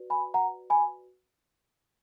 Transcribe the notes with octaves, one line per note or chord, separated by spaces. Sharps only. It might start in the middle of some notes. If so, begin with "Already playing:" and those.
Already playing: F#4 B4 D5
G#5 B5
F#5 A#5
G#5 B5